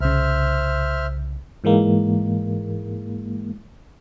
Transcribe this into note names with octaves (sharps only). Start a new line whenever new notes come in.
C2 C#3 C5 E5 F6
G#2 E3 G#3 A#3